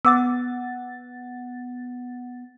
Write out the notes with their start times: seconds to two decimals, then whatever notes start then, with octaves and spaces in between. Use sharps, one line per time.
0.05 B3 F#5 D6 E6 A6